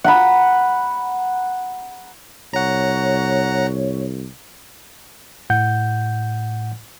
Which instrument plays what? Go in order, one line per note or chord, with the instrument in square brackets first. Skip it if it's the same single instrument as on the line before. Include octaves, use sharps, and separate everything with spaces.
[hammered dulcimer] F#5 A#5 B5
[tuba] C2 [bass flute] C#5 [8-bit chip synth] F#5 A#5
[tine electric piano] A2 F#5 G6